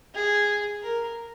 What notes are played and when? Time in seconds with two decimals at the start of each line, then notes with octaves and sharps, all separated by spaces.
0.15 G#4
0.82 A#4